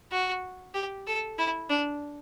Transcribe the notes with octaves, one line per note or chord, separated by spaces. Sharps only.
F#4
G4
A4
E4
D4